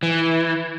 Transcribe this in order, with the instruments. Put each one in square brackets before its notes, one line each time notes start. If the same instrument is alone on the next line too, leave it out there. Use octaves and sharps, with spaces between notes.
[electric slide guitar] E3